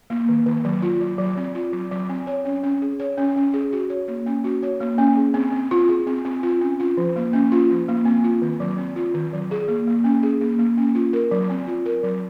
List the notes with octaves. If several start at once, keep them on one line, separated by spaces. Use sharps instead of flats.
A#3
D#3
D#3
F#3
F4
F#3
F#3
C4
F4
F#3
F#3
C4
C#5
C#4
C#4
G#4
C#5
C#4
C#4
G#4
F#4
C#5
A#3
C#4
F#4
C#5
A#3
C#4
G#4
C4
C4
F4
G#4
C4
C4
F4
C#4
F4
F3
A#3
C#4
F4
F3
A#3
C4
F4
D#3
F#3
C4
F4
D#3
F#3
G#4
A#3
A#3
C#4
G#4
A#3
A#3
C#4
F4
A#4
F#3
C4
F4
A#4
F#3